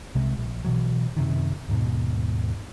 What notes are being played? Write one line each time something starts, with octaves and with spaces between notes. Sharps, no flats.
C2 C3 G#3
A#1
B2 E3 F#3
F#2 C3 D#3
D#2 G#2 B2